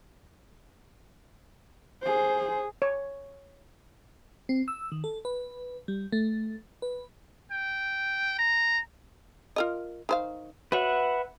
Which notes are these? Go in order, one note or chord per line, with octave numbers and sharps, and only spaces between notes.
G#4 C5
C#5
C4
E6
D#3
A4
B4
G3
A3
B4
G5
A#5
F4 A#4 D#5
D#3 C5 F5
F#4 B4 C#5 E5 F#5